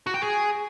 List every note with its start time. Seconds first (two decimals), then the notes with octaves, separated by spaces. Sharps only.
0.07 F#4
0.14 G5
0.22 G#4